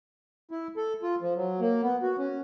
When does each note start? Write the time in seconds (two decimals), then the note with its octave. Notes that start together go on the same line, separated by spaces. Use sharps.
0.51 E4
0.77 A4
1.03 F4
1.22 F3
1.36 F#3
1.60 A#3
1.83 B3
2.02 F#4
2.18 C#4